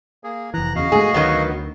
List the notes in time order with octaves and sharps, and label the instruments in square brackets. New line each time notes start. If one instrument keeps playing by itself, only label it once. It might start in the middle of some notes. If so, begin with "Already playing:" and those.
[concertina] A#3 G#4
[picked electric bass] F1 E3 [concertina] A#5 F#6
[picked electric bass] E2 C#3 [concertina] F#4 D#5 F5
[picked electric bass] G#2 A3 [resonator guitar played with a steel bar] G#4
[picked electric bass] D2 [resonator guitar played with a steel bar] D#3 F#3 B3